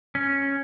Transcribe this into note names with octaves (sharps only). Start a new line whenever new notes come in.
C#4